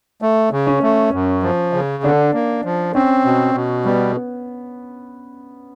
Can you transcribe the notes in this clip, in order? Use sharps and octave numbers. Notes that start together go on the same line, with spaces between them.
A3
C#3
C#4
A3
F#2
F3
C#3
D3 D4
A#3
F3
C4 C#4
B2
B2
G3 B3